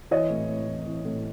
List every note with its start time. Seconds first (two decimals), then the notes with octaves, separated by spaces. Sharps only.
0.11 E3 C#5 D#5
0.30 A2
0.49 A2
0.68 E3
0.86 E3
1.05 A2